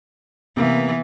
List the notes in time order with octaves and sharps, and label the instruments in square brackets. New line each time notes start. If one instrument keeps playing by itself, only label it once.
[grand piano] C3 A#3 [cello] E3 B3